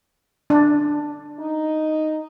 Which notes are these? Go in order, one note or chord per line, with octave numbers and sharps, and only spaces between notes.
D4
D#4